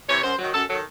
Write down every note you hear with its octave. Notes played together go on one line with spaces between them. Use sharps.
C3 E3 C#5
F#2 C5
D#3 F#3
F#2 A4
D#3 F#3 A4